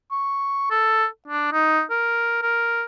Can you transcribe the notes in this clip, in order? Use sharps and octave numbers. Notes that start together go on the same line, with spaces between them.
C#6
A4
D4
D#4
A#4
A#4